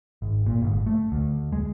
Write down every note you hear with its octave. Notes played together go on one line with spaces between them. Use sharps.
G#1
A#2
G1 G#2
A3
D2
G#3